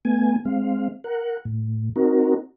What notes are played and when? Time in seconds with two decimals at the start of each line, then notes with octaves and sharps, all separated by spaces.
0.05 A3 B3 G#5
0.45 G#3 C4 F5
1.04 A#4 F#5
1.45 A2
1.96 C4 D#4 F#4 A#4